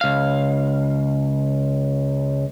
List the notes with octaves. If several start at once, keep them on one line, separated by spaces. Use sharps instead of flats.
C#2 F5